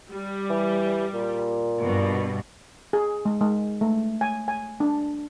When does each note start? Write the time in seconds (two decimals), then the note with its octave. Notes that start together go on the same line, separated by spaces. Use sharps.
0.11 G3
0.50 E3
1.14 A#2
1.81 G2 B2
2.93 G#4
3.25 G#3
3.41 G#3
3.81 A3
4.21 G#5
4.48 G#5
4.80 D4